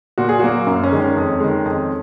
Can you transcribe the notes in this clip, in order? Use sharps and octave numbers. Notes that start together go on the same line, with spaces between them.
A#2 F#4
G#4
F#3 A#3 F#4
F#2
C#4
D#3 G#3
C#4
F2
D#3 G#3
F2